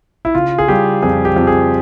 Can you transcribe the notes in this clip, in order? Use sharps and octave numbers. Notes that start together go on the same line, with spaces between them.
E4
C#3 F4
G#4
G3 G4
F2 G#4
G4
F2
G#4